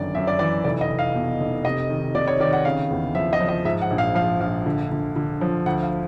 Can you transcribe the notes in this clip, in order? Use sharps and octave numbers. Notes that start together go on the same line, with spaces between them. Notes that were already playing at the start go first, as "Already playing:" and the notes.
Already playing: G1 F#2 D#3 D5
F#2 E5
D5
E3 D5
F1 D5
D#5
F1
F5
B2
F1
C3 D#5
D#3
C3 D5
C#5
D#3 D5
F#5
C#3 F5
E2
F3 E5
D#5
F3
D#5
G#2 E5
F#5
A#1
F5
F3 F5
A#1 F5
D3
D3
D3
F3
D2 F#5
F5